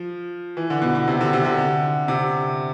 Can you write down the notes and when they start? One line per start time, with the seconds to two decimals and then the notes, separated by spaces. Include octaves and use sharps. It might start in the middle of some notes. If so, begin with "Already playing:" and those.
Already playing: F3
0.57 E3
0.70 D3
0.82 B2
0.95 B2
1.08 C3
1.21 D3
1.33 C3
1.45 D3
1.58 D3
2.08 C3